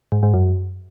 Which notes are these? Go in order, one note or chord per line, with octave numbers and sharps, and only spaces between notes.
G#2
G#2
F#2